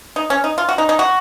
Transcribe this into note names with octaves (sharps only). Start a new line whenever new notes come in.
D#4
C#4
D#4
F4
F#4
D#4
D#4
F#4